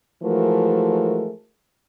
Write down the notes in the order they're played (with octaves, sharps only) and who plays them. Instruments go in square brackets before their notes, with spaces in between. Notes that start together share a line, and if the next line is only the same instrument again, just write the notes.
[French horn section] E3 F3 G#3 A3 F#4 A#4